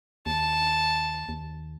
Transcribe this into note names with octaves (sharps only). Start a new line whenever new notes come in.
D#2 A5
D#2